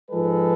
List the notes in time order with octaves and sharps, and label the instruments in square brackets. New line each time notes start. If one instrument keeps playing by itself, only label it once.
[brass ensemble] G#2 F3 G#3 A4 B4